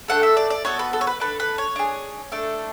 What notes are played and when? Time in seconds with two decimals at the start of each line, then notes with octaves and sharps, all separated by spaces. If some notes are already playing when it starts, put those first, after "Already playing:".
0.08 A3 D4 A4 F#5
0.23 E5
0.37 D5
0.50 D5
0.65 B3 F#4 A4 C#5
0.79 B4
0.93 A4
1.01 C#5
1.07 B4
1.20 D4 A4 B4
1.40 B4
1.58 C#5
1.76 D4 G#4
2.32 A3 D4 A4